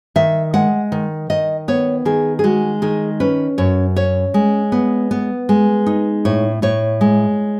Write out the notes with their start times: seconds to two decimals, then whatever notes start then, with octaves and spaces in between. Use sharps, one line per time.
0.16 D#3 E5
0.53 G#3 F#5
0.92 D#3
1.30 D#3 D#5
1.68 B3 C#5
2.05 D#3 G#4
2.39 G#4
2.44 G#3 F#4
2.82 D#3 G#4
3.20 C#4 B4
3.58 F#2 C#5
3.96 C#4 C#5
4.34 G#3
4.72 B3
5.11 B3
5.49 G#3
5.86 D#4
6.25 A2 C#5
6.62 A2 C#5
7.01 G#3